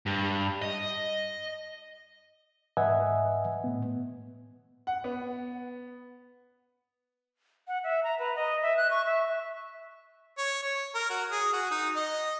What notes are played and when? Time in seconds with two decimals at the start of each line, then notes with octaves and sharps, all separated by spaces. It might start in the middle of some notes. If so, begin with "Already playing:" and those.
0.06 G2
0.62 D#5
2.77 G#2 B4 D#5 E5 F#5 G#5
3.64 A2 B3
4.87 F#5
5.04 B3
7.68 F#5
7.84 E5
8.03 A#5
8.19 B4
8.36 D#5
8.63 E5
8.77 F#6
8.91 C#6
9.06 E5
10.38 C#5
10.62 C#5
10.95 A#4
11.10 F#4
11.31 G#4
11.53 F#4
11.71 D#4
11.95 D#5